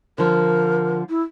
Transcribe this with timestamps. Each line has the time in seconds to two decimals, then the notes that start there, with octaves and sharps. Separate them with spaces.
0.18 D3 F3 A#4
1.10 E4